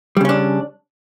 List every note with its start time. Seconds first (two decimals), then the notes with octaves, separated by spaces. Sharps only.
0.17 G3
0.21 C#3
0.25 C#4
0.29 D4